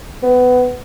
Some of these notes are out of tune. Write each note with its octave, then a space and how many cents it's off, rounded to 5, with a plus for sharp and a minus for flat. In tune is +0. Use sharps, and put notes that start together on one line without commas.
B3 +20